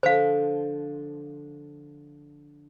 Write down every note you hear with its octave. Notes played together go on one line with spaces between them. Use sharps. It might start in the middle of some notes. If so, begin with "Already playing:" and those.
D3 F3 C5 F5